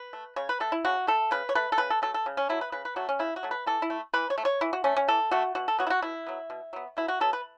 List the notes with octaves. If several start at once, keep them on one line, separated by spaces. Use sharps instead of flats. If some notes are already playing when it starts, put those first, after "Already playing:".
Already playing: B4
A3
C#3 C#5
B4
A3 A4
E4
C#3 F#4
A3 A4
C#3 B4
C#5
A3 B4
A4
C#3 B4
A4
F#3 A3 A4
A4
C#3
C#4
F#3 A3 E4
B4
C#3 B4
B4
F#3 A3 F#4
C#4
C#3 E4
F#4
F#3 A3
B4
E3 A4
E4
A3
E3 B4
C#5
A3
C#5
E3 E4
F#4
A3 C#4
C#4
E3 A4
A3 F#4
B2 F#4
A4
F#3 B3 F#4
E4
F#4
B2 E4
F#3 B3
B2
F#3 B3
B2 E4
F#4
F#3 B3 A4
B4